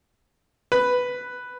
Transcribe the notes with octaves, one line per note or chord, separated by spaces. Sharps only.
B4